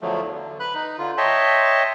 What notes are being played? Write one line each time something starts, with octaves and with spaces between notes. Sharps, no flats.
E2 D3 F3 F#3 A3
D3
B4 B5 F#6
D#4
D3 F4
C#5 D#5 E5 G5 A5 C6